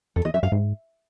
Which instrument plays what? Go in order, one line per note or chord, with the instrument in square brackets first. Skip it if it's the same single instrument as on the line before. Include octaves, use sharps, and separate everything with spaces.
[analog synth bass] F2 [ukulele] A4
[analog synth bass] E2 [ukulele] D#5
[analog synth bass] F#2 [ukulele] E5
[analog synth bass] G2 [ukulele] F5
[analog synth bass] G#2